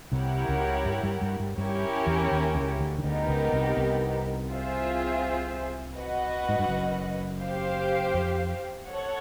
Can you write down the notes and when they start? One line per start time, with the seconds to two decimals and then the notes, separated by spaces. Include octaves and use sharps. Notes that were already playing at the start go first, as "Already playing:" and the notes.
0.12 C2 C3 E4 G4 A#4 C#5 F#5
0.49 C#2 C#3
0.85 G2 G3
1.03 G2 G3
1.21 G2 G3
1.40 G2 G3
1.58 G2 G3 C#4 E4 G4 A#4 C#5
2.07 E2 E3
2.31 D#2 D#3
2.55 C#2 C#3
2.79 D2 D3
2.99 D#3
3.04 D2 D3 B3 D#4 G4 A#4
3.28 C#2 C#3
3.52 C2 C3
3.77 C2 C3
4.50 C4 F4 G#4 C5 E5
5.96 F#4 B4 D#5 F#5
6.49 G#2
6.59 G2
6.69 F#1 F#2
7.41 G4 C5 F5
8.14 F2
8.87 A4 C#5 F#5